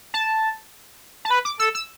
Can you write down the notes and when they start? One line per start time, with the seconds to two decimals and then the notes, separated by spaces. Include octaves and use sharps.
0.14 A5
1.25 A5
1.30 B4 B5
1.45 D6
1.60 A4 E6
1.75 E6